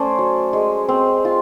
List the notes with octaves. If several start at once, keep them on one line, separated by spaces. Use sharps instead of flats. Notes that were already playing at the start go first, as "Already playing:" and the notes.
Already playing: A3 C#4 C5 D5
F#3
G#3
C4
F4